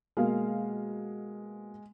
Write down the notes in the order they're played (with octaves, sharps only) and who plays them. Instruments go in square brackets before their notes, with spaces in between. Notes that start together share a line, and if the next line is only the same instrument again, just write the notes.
[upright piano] B2 A#3 F5 [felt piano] G#3